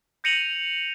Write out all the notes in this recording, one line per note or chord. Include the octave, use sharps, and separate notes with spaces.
G6 A#6 C#7 D#7 F7 F#7